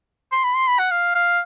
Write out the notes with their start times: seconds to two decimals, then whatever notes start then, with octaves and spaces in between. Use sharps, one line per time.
0.32 C6
0.44 B5
0.56 C6
0.68 B5
0.79 F#5
0.91 F5
1.15 F5